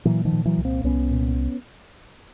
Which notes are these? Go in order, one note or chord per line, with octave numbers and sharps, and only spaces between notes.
A#2 E3 F#3
D#3 F3
A#2
E3 F#3
C2
A#3 C4
C2 B3 C#4
A#2